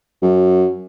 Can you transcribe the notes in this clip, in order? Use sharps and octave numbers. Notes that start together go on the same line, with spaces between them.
F#2